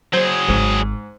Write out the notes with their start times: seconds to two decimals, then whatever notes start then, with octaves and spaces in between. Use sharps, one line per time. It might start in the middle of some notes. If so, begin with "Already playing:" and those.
0.13 F#3 G#4 C5
0.48 G#1 G#2